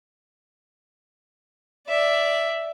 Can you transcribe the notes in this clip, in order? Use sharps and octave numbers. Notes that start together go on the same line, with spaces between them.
D5 E5